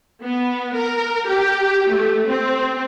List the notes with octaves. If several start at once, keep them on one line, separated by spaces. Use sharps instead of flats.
B3
A#4
G4
A3
C4